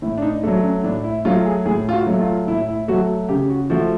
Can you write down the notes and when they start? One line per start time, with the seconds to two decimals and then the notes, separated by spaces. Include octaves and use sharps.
0.02 A2 E4
0.18 D4
0.22 D#4
0.43 A3 D4
0.47 F#3
0.63 C#4
0.84 A2 D4
1.04 E4
1.25 F#3 A3 F4
1.46 G#4
1.66 A2 G#4
1.89 F4
1.93 F#4
2.06 F#3 A3
2.20 F4
2.47 A2 E4
2.68 E4
2.88 F#3 A3 F#4
3.29 C#3 G4
3.50 F#4
3.70 F3 A3 F#4